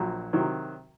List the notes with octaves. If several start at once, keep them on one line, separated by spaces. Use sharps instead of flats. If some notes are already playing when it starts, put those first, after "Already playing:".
Already playing: A#1 A#2 F#3
C3 D#3 F#3